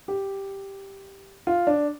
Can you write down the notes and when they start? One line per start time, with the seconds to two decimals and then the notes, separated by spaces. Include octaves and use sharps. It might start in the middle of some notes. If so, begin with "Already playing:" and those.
0.08 G4
1.47 F4
1.67 D4